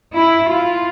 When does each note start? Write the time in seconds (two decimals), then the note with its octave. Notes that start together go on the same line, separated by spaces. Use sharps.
0.14 E4
0.49 F4